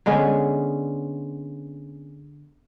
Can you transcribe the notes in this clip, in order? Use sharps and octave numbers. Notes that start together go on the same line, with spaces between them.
D3 G#3 B3 C#4